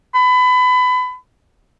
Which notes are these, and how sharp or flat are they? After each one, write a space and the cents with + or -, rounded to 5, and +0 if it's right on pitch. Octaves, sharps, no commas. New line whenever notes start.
B5 +25